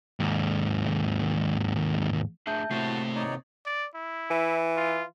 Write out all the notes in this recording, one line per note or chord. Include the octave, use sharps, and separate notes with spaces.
D#2 G#2
A3 D4 G#4 E5 A5 G6
A2 C3 A3 A#3 C4 F#4 A5 C7
D#4 C#5 D5
D5
E4
E3
F4